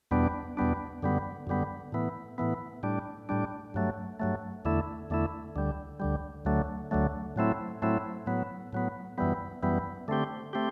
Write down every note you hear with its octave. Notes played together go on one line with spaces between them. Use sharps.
E2 B2 G3 B3 D4
E2 B2 G3 B3 D4
F#2 D3 G3 B3
F#2 D3 G3 B3
A2 E3 B3
A2 E3 B3
A2 G3 D4
A2 G3 D4
G2 F#3 A3
G2 F#3 A3
E2 D3 A3 E4
E2 D3 A3 E4
D2 D3 G3
D2 D3 G3
D2 D3 F#3 A3
D2 D3 F#3 A3
A2 F#3 A3 C4 E4
A2 F#3 A3 C4 E4
A2 F#3 B3
A2 F#3 B3
F#2 E3 G3 B3
F#2 E3 G3 B3
D3 A3 C4 G4
A3 C4 G4